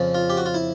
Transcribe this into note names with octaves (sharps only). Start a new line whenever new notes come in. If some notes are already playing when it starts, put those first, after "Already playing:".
Already playing: F2 C#3 F3
F4
G4
F#4
F4
E4